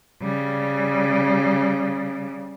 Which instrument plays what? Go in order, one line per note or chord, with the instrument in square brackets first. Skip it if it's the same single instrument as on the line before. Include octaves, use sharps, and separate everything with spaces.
[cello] C#3 G3